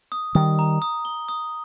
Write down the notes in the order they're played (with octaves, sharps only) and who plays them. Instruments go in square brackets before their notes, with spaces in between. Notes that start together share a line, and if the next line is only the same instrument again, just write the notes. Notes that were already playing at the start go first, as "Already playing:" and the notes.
[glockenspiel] D#6
[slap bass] D#3 G3 [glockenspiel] D#6
[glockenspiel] A#5
D#6
G7
D#6